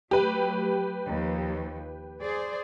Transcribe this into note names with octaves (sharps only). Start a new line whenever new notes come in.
F#3 A3 G4 B4
D#2 F3
G#4 C5 D5